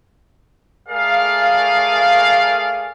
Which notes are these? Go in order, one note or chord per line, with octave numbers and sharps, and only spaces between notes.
A3 G#4 A#4 D5 F5